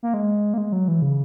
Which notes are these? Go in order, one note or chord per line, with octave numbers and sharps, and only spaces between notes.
A#3
G#3
A#3
G#3
F#3
E3
C#3